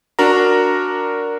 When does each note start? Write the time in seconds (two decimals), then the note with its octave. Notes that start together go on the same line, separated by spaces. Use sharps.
0.19 D4 F#4 A#4 A#5